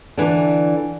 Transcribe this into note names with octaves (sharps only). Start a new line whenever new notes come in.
D3 E3 D4